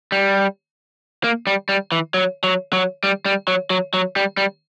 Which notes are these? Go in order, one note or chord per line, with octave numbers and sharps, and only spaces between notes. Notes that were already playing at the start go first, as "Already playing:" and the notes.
G3
A#3
G3
G3
E3
F#3
F#3
F#3
G3
G3
F#3
F#3
F#3
G3
G3